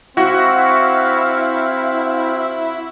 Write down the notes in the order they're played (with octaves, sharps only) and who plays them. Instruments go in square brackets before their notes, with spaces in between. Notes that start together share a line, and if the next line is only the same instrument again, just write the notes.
[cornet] C4 [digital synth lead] E4 [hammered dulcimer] F#4 [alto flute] F5